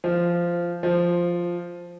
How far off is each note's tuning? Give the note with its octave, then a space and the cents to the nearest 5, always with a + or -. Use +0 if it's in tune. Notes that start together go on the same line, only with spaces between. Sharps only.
F3 -10
F3 +0